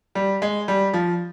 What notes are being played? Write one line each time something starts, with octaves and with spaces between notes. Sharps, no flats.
G3
G#3
G3
F3